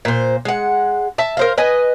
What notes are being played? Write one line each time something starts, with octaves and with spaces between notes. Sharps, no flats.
A#2 C5
G#3 F#5
E5 A5
A#4 C5 F5
B4 D#5 G#5